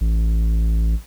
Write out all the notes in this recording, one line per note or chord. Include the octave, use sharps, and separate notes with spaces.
A1